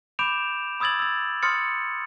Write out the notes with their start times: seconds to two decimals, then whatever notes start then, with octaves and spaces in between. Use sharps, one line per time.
0.19 B5 D6 G6 D7 E7 F7
0.80 B5 D#6 E6 G#6 A6 F#7
0.99 E6 A6
1.43 C6 D#6 F6 A6 C#7